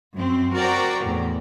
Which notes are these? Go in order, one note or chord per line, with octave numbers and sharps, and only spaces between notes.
F#2 C4
F#4 A#4 C5 D5 G5 A#5
E2 A2